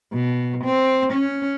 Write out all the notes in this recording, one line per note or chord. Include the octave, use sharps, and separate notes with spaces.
B2
C4
C#4